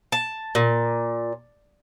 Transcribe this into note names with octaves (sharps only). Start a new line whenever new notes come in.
A5
A#2